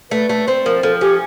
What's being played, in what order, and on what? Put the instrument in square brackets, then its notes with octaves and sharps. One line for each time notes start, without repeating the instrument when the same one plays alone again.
[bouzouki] A3 [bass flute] B4
[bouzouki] A3
C4
[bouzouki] F3 [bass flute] A#4
[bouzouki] F3 [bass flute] A4
[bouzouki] C#4 [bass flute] G4